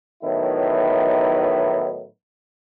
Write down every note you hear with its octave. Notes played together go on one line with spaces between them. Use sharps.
A2 D#3 F#3 B3 D#4 E4